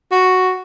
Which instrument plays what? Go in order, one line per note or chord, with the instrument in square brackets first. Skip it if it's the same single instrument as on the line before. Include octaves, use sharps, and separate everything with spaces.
[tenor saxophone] F#4